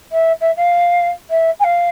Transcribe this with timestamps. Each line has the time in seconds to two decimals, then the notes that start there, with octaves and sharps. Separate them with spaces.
0.12 E5
0.41 E5
0.57 F5
1.30 E5
1.60 G#5
1.64 F5